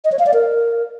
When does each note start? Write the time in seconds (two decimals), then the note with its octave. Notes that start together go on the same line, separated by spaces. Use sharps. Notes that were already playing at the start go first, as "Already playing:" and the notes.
0.05 D#5
0.12 C#5
0.19 F5
0.26 D5
0.34 A#4